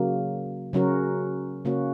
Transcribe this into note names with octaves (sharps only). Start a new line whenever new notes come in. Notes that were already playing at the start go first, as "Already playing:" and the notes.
Already playing: C#3 F#3 A#3
C#3 F#3 C#4 F#4 A#4
C#3 A#3 C#4 F#4